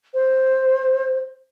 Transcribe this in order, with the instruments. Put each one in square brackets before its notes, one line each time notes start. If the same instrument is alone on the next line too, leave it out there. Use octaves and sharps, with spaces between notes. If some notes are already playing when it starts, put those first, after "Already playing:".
[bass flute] C5